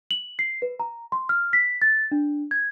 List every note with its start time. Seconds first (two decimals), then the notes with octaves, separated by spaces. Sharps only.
0.11 F#7
0.39 C7
0.62 B4
0.80 A#5
1.12 C6
1.29 F6
1.53 B6
1.82 A6
2.11 D4
2.51 G#6